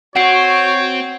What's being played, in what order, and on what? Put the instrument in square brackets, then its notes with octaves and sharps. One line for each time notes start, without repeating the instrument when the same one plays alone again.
[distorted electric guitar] C4 [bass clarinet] F#4 [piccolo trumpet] C#5 [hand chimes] F#5 C7